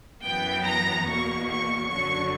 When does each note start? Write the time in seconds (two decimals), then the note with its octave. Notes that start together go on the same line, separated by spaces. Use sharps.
0.24 F#2 E3 B3 G5
0.65 A#5
1.06 E2 B2 A#3 C#6
1.48 C#6
1.89 F#2 D3 F#3 C#6